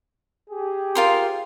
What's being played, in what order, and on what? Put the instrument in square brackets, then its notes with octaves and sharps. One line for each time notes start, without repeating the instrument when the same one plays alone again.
[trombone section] G4 G#4
[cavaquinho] F4 A#4 C5